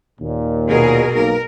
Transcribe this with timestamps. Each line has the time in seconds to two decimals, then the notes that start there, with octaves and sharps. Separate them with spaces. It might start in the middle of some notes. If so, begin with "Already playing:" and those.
0.20 D#2 A#2
0.68 B2 G#4 A#4
1.14 B1 A#3 A#4